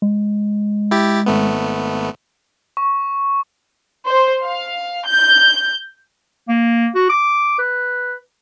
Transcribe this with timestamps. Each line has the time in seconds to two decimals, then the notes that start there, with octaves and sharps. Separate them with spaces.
0.02 G#3
0.91 E4 G4 A6
1.26 G#1 A3 B3
2.77 C#6
4.06 C5
4.44 F5
5.06 G6
6.48 A#3
6.95 F#4
7.09 D6
7.59 B4